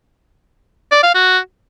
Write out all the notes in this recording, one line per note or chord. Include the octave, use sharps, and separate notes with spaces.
D5
F5
F#4